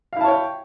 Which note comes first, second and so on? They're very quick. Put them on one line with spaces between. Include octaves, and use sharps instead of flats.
F5 E4 A5 C#5 G5